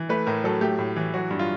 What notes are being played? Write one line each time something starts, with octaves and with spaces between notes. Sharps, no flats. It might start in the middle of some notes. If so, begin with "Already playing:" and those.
Already playing: E3
A3 B4
A2 A#4
F#3 A4
A3 G4
A2
E3
F#3 F#4
G2
F4